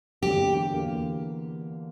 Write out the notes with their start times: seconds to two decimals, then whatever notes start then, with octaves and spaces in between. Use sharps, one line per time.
0.22 E2 D3 F#3 A#3 G4
0.72 E2 D3 A#3